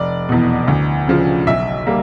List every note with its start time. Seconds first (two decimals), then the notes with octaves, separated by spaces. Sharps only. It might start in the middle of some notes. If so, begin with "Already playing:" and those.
Already playing: F1 D5
0.29 E2 B2
0.68 D2
1.07 C#3 F3
1.47 B1 E5
1.87 G3 A#3